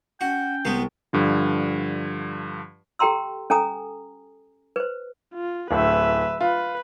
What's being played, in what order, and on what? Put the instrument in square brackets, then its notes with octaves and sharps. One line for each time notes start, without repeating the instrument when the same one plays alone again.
[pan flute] C#4 [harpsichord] F#4 [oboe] G5
[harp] C2 [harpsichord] G#3 B3
[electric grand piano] G2 D3 F3
[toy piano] G4 A4 G5 A#5 C6 E6
C#4 A4 G#5 A#5 D#6
B4 C5
[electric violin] F4
[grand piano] D1 A2 [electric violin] B4 E5
[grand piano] F4 [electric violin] B4